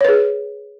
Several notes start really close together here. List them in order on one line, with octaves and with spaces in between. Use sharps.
C#5 B4 G#4